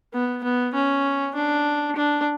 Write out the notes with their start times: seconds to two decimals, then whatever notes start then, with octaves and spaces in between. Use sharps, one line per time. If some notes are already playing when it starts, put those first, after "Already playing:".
0.13 B3
0.43 B3
0.74 C#4
1.35 D4
1.96 D4